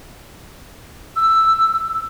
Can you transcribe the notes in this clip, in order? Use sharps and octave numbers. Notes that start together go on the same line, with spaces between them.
E6